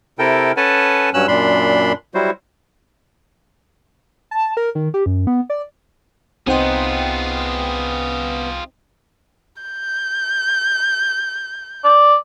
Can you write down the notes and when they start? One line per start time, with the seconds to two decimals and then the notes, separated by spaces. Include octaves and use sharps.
0.19 C3 E4 A4 A#4 G5
0.57 C#4 A4 B4 F#5 G#5 A5
1.14 G2 F#3 C#4 E6 F#6
1.28 F#2 A#2 D4 B5 C6
2.15 F#3 G3 E4 F#4 C5
4.31 A5
4.57 A#4
4.75 D#3
4.94 G4
5.06 F#2
5.27 B3
5.50 D5
6.47 C2 B3 C4 D#4 F4 G#4 C5 G5
9.62 G6
11.84 D5